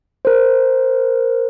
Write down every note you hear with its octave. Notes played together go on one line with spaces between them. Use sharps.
A#4 C5